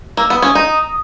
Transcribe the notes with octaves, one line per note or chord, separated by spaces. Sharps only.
A#3 E6
B3
D#6
C#4
D#4